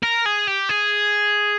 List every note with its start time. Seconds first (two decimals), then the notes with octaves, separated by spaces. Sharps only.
0.03 A#4
0.25 G#4
0.47 G4
0.69 G#4